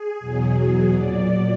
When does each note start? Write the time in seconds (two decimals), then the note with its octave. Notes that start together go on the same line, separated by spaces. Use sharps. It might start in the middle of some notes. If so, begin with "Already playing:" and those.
Already playing: G#4
0.20 E2 B2 F#3
0.92 A#2 F#3 D5